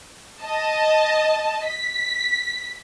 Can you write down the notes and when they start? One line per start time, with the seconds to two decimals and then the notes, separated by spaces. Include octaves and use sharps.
0.42 D#5 A5
1.67 B6